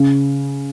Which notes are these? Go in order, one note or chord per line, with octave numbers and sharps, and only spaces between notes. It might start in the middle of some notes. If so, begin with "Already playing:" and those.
Already playing: C#3